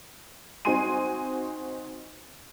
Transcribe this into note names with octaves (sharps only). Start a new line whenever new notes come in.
C4 D#4 F#4 G#5 C6 D#7